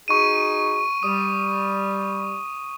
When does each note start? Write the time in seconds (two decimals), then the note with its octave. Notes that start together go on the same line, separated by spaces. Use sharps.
0.08 D#4 F#4 G#4 C#6 D#7
1.03 G3 D#6